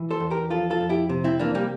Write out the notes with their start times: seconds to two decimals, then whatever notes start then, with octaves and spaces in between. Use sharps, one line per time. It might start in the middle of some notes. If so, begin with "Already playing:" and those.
Already playing: E3
0.11 A4 C5
0.20 E2
0.30 G4 A#4
0.50 F3 F4 A4
0.70 F4 A4
0.81 F2
0.89 E4 G4
1.09 C3
1.24 C4 E4
1.39 E3 A#3 D4
1.54 G3 A#3